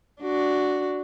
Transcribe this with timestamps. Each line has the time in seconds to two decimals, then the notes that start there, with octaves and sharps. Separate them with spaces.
0.22 D4 F#4